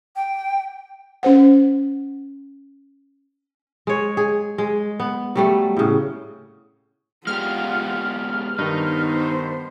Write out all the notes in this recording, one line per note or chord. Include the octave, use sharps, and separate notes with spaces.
G5
C#4 C5 F#5
G#3 C#5
G#4
G#3
B3
F#3 G3 A3
A2 C#3
G#3 B3 F4 G4 F#5 F6
G2 D#3 B3 D#4 C5